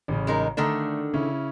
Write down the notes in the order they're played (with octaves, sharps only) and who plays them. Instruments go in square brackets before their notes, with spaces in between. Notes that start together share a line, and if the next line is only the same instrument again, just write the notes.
[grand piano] A1 C#3
[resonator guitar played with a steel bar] G#3 D#4 A#4
[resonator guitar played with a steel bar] D3 D#3 D4 [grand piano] A3
[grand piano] C#3 C#4 E4